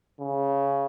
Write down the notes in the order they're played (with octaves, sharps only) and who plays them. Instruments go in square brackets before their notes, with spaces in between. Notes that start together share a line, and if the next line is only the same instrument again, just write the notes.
[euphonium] C#3